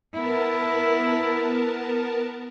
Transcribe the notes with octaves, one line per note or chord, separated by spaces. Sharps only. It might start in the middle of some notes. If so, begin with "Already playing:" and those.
B3 E4 A#4 A5